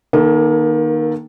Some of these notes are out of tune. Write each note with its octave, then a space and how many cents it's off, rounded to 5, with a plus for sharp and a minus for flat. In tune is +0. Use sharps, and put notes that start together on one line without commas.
D#3 -5 A#3 +25 A4 +0